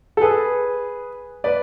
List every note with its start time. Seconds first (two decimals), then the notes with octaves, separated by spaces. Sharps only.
0.17 A4
0.21 G#4 B4
1.44 B4 D5